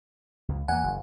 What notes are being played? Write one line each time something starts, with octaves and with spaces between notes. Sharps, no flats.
C#2
E2 A#3 F#5 G#5
F#1